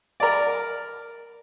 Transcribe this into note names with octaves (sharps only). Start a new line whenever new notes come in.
A#4 D5